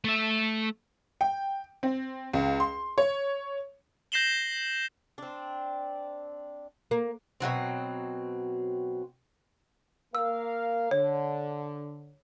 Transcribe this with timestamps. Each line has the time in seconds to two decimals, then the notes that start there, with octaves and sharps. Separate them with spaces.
0.04 A3 E5
1.21 G5
1.83 C4
2.33 C#2
2.60 C6
2.98 C#5
4.12 G6 A#6 C7 E7 F#7 G7
5.18 C4 D4
6.91 A#3
7.40 B2 D3 F#3 C4
10.15 A#3 A#4 F5 E6
10.91 D3 C#5